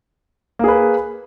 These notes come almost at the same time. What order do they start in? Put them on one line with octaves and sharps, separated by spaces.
A#3 G#4 B4